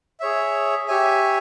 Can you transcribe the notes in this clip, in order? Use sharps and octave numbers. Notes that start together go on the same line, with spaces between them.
G#4 C#5 E5
G4 C#5 E5 G#5